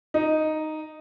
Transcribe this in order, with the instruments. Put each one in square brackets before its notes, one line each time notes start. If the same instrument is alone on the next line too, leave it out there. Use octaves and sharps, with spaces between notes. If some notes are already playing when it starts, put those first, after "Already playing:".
[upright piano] D#4